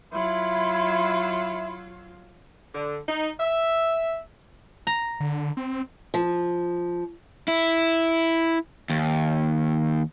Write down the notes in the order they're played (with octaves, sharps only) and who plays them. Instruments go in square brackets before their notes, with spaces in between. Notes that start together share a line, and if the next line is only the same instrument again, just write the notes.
[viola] F#3 F4 [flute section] E4 B5 C6 [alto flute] E5
[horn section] D3
D#4
E5
[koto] A#5
[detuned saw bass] D3
C4
[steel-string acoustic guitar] F3
[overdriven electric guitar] E4
D#2